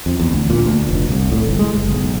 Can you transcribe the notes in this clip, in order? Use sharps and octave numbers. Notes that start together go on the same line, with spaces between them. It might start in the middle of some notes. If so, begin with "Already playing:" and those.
F2
E2
D2
A#2
D2
F1
C2
A2
G1
G#3
F#1
B1